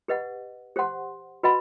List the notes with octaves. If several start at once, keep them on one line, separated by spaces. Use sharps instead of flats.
G4 B4 D#5 F#5
G4 C5 F#5 C6
F#4 B4 D#5 F#5 B5